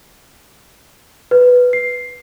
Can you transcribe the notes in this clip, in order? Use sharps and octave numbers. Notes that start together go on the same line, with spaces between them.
B4
C7